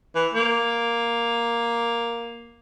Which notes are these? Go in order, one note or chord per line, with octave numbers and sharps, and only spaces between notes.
E3
A#3